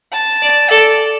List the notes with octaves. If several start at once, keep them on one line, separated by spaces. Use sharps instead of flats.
A5
D5
A4 D5